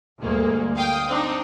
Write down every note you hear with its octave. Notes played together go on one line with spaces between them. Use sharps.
D2 G2 G#3 A#3
F5 G5 D#6
C4 D4 D#4